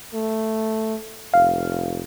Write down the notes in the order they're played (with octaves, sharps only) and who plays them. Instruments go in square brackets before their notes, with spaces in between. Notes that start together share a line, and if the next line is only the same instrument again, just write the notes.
[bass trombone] A3
[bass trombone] F1 [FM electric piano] F5